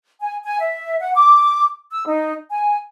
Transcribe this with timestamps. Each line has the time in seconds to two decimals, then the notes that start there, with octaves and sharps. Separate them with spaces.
0.21 G#5
0.44 G#5
0.60 E5
1.00 F#5
1.15 D6
1.91 E6
2.06 D#4
2.50 G#5